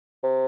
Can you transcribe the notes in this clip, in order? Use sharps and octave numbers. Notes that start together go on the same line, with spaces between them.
C3